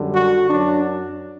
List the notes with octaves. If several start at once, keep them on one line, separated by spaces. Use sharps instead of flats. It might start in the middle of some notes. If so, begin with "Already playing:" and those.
Already playing: F#2 D3 G3
F#4
F#2 F#3 D4